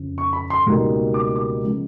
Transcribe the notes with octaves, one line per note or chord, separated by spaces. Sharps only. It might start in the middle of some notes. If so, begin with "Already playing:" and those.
Already playing: F2 C#3 F3
C#6
B5
C6
C#2 B2 G3 A#3 D#4
D6
D6
C#3 F3 G#3